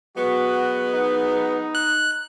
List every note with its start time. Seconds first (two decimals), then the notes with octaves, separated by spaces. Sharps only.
0.17 F#3 G#3 B3 F#4
0.94 D#4
1.75 F#6